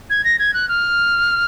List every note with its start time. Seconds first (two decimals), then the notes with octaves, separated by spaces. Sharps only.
0.10 G#6
0.24 A#6
0.39 G#6
0.54 F#6
0.69 F6